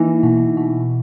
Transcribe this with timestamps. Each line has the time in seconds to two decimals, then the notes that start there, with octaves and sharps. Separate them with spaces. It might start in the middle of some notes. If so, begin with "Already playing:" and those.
Already playing: E3 A#3 D#4
0.23 B2
0.57 B2